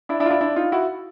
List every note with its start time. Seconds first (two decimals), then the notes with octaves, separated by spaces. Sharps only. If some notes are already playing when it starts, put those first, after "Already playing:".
0.09 D4 E4
0.20 D4 E4
0.26 F4
0.30 D4 E4
0.41 D4 E4
0.56 D#4 F4
0.72 E4 F#4